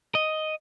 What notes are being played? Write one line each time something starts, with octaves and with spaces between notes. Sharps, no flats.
D#5